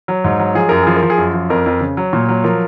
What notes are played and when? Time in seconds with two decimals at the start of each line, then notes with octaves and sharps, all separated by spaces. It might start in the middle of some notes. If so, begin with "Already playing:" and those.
0.08 F#3
0.24 G#2
0.39 F#3
0.55 F3 G#4
0.69 F#2 A#4
0.83 F3 G#4
0.97 A#4
1.03 F3
1.10 G#4
1.18 F#2
1.34 F3
1.50 F2 A#4
1.66 F2
1.81 C#3
1.97 F#3
2.13 A#2
2.29 F#3
2.44 F3 A#4